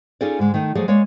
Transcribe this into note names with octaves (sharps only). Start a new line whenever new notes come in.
C#4 D#4 F4 G#4 A4 D5
G#2 D3 G#3
D#3 A3 D#4
F3 F#3 A3 G#4 D5
G#3 A#3 C#5 D5